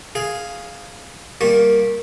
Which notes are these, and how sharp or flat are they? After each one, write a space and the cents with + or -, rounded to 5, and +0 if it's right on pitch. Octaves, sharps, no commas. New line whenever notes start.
G#4 +0 F5 +0
G3 +0 A#3 +0 C#6 -30